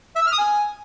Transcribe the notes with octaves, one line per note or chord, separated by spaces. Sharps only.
E5
E6
F6
D#6
G#5